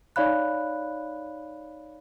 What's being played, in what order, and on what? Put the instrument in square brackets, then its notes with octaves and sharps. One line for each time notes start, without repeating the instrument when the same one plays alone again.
[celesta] D#4 C#5 D5 F5 B5 F#6